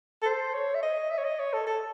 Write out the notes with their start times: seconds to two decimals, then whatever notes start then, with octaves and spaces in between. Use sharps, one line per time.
0.22 A4
0.25 C5
0.54 C#5
0.74 E5
0.82 D#5
1.10 E5
1.18 C#5
1.24 D#5
1.39 C#5
1.53 A4
1.67 A4